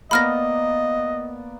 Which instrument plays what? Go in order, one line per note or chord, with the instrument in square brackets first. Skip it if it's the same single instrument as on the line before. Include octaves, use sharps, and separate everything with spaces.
[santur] A#3 B3 D5 [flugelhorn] D#5 [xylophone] B5 F6 A#6